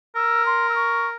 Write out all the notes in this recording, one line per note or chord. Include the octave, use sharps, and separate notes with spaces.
A#4 E6
C6
E6
C#6